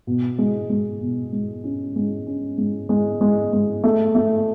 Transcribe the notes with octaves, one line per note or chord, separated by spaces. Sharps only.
B2
G#3
G#3
B2
G#3
C#4
G#3
C#4
G#3
G#3
G#3
G#3
A3
A3